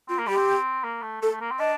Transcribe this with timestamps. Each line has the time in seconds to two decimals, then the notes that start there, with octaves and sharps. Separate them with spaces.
0.09 C4 F4
0.19 A#3
0.27 G3 G4
0.36 C4
0.84 A#3
1.02 A3
1.21 A3 A4
1.32 A3
1.41 A#3
1.51 C4
1.59 D4 D#5